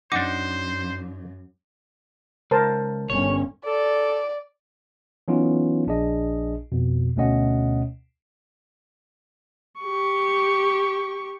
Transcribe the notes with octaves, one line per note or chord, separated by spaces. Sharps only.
F#2 D4 D#4 C5 F#5 D6
C#2 A#4 C5 A5
G1 G2 C#4 C#5
A4 D5
E3 F#3 B3 C#4 D#4 F4
A#1 D4 G#4 D#5
F2 B2
D2 B2 A3 C#4 D#5 F#5
G4 C#6